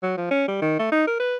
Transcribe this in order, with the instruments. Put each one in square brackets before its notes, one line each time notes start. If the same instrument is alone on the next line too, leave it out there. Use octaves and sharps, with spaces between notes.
[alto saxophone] F#3
F3
C#4
G3
D#3
A3
D#4
A#4
B4